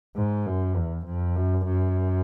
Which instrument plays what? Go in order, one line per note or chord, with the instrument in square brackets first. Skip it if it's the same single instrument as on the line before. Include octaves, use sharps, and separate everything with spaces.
[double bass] G#2
F#2
E2
F2
F#2
F#2